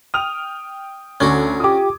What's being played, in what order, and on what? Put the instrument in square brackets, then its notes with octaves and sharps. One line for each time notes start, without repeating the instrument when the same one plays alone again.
[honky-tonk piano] G5 F6 F7 [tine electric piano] D#6
[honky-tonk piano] D2 G#6 [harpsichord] C#4 D4 F#4
[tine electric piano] F4 G4 [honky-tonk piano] D6 D#6